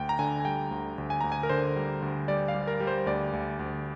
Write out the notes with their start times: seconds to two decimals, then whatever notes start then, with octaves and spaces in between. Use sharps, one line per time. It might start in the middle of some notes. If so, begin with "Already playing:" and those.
Already playing: D2 G5
0.09 A#5
0.19 D3 G#5
0.40 G#5
0.45 G3 G5
0.71 D2
0.98 D2
1.10 G#5
1.21 D2 A#5
1.32 G#5
1.43 A#4
1.49 D3 C5
1.76 G3
2.02 D2
2.28 G3 D5
2.48 F5
2.55 G3
2.67 A#4
2.80 G3
2.87 C5
3.06 D2 D5
3.33 D2
3.59 D2